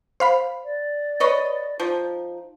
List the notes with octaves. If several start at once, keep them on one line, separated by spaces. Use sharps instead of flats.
C5 F5 B5
D5
B4 C#5 D#5
F3 D#4